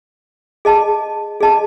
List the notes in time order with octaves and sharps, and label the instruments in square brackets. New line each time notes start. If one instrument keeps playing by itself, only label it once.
[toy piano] G#4 D#5 A5
G#4 D#5 A5